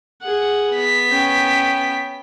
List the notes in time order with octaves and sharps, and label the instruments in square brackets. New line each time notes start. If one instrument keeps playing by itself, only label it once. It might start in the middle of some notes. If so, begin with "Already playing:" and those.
[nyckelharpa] G#4 F#5
[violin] B3 B6
[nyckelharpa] C#4 G5